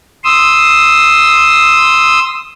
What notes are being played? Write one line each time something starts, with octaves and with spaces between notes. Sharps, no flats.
C6 D#6 E6